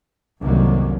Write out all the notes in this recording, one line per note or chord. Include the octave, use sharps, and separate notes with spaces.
C2 F#2 D3 D#3 F#3 A#3